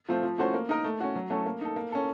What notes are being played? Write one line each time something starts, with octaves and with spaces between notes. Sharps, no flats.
F3 A3 C4 F4
F3
A3 C#4 F#4 C5
A#3
D#4 A#4 D#5
A3
C#4 F#4
F#3
A3 C#4 F#4 A4
A#3
D#4 A4
A#3
C#4 A4